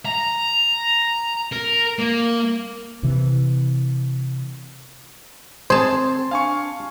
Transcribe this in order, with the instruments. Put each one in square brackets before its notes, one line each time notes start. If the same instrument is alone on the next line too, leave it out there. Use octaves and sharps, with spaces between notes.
[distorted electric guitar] A#5
A#4
A#3
[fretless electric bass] C3 E3
[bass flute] C4 [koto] G#4 A5 [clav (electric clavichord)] C5 [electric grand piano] C6
[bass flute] D4 [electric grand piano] F5 G#5 C#6